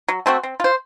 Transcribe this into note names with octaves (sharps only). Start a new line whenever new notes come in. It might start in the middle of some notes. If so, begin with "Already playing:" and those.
F#3
A3 C4 F#4
C4
F4 C5